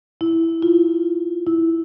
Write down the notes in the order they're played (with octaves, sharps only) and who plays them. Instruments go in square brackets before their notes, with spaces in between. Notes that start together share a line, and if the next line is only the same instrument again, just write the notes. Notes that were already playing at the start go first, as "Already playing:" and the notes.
[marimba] E4
F4
E4